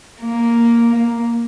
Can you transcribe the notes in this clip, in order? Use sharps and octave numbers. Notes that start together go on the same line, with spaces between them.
A#3